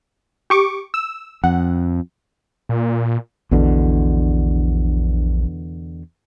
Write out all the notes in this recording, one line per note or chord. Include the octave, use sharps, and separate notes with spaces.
G4 C#6 D6
E6
F2 F#5
A#2
A#1 E2 B2 D3